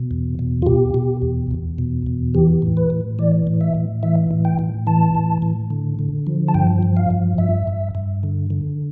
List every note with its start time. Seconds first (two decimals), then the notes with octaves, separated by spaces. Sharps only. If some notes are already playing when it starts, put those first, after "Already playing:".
Already playing: B2
0.11 E2
0.39 B2
0.62 F4
0.66 B2 G4
0.94 B2
1.22 E2
1.51 E2
1.78 B2
2.06 E2
2.35 E3 G4
2.62 A2
2.77 B4
2.90 A2
3.19 E3 D5
3.47 A2
3.61 E5
3.75 A2
4.03 E3 E5
4.31 A2
4.45 G5
4.59 A2
4.87 E3 A5
5.15 A2
5.42 A2
5.70 D3
5.99 D3
6.27 F3
6.48 A5
6.54 G2 G5
6.83 F3
6.97 F5
7.10 G2
7.38 G2 E5
7.67 G2
7.95 G2
8.23 D3
8.50 D3